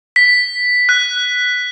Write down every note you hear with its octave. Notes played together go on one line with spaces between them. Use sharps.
B6
F#6